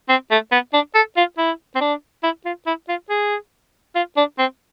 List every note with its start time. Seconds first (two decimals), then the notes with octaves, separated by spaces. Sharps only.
0.09 C4
0.31 A3
0.51 B3
0.73 D4
0.94 A4
1.17 F4
1.38 E4
1.75 C4
1.81 D4
2.23 E4
2.45 F4
2.66 E4
2.88 F4
3.09 G#4
3.95 F4
4.17 D4
4.38 C4